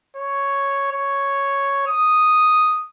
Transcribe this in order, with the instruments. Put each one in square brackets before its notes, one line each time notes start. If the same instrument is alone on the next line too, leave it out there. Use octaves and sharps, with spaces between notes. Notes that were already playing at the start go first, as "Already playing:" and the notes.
[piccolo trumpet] C#5
C#5
D#6